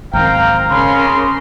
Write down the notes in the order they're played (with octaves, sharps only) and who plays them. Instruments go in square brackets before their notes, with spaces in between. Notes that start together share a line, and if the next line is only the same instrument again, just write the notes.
[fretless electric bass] G#1 F#2 D#3 [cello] C4 [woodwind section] F5 G5 [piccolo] A#5
[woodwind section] C#3 [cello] C#4 A#4 [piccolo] C6